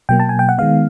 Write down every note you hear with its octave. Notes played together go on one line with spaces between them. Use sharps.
B2 F#3 A#3 G5
A5
G#5
G5
F#5
D#3 G#3 B3 F5